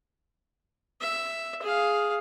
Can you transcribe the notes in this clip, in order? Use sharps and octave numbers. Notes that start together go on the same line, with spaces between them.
E5
G#4 F5